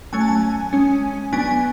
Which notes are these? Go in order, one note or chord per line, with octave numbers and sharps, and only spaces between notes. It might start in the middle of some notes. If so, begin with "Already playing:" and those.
F#3 A3 C#4 G#5
A5
G#5
G#3 C#4
F#3 B3 D4 G#5
G#5